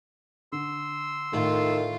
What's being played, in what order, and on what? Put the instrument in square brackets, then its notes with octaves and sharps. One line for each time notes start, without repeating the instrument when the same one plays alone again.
[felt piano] D3 [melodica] C6 E6
[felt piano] A2 [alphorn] D#3 [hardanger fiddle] F4 A4